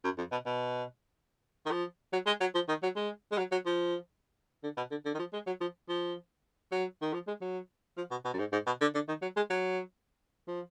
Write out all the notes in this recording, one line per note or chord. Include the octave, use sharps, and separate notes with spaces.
F#2
F2
B2
B2
D#3
F3
F#3
G#3
F#3
F3
D#3
F#3
G#3
G#3
F#3
F#3
F3
D3
B2
D3
D3
D#3
F3
G#3
F#3
F3
F3
F#3
D#3
F3
G#3
F#3
F3
B2
B2
F#2
G#2
G#2
B2
D3
D3
D#3
F#3
G#3
F#3
F3